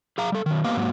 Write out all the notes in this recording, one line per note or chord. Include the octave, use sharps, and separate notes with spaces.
G#4 F5 A#5
G3 A4
D#3 F#3
A#3 B3 G4 B4 D#5 F5
G#2 F#3 A#3 F#5